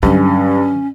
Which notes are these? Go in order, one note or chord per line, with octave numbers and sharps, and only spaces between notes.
G2 D3 F#3 C#4